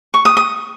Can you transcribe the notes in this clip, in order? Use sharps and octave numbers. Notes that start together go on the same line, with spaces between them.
C#6
D#6
D#6